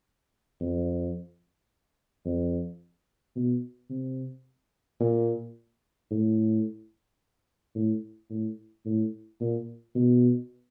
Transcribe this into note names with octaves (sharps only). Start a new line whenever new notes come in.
F2
F2
B2
C3
A#2
A2
A2
A2
A2
A#2
B2